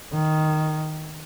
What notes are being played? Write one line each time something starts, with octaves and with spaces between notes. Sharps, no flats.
D#3